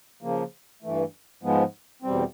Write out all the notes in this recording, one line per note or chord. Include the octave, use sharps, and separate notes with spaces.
C#3 F3 A#3
G2 E3 A3
G#2 F3 G#3 B3
E2 B2 G3 C4